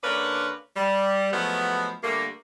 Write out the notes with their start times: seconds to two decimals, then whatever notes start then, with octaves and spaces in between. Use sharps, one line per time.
0.03 D3 A#3 C#4 D4 A#4 B4
0.76 G3
1.33 F3 F#3 G#3 A3 B3
2.03 D3 G3 A3 A#3